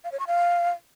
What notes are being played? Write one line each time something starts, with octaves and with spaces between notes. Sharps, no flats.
F5
C#5
C#6
F5